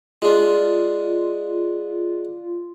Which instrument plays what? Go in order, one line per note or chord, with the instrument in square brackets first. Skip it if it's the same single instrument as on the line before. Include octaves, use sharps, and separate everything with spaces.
[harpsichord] G#3 D4 [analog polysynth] F4